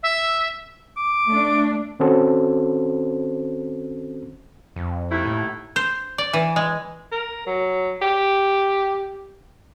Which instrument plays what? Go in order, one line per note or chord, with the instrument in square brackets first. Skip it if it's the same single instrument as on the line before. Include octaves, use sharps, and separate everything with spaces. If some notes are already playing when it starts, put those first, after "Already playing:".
[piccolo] E5
[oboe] D6
[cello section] A3 D4
[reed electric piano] D#3 C4 C#4 F#4 A4 C5
[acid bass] F2
[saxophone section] D#2 A3 E4
[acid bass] A2
[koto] C5
D5
E3
G#3
[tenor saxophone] A#4
F#3
G4